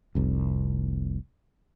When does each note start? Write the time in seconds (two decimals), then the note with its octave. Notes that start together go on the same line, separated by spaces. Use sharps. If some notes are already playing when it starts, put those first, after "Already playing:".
0.15 F1 C2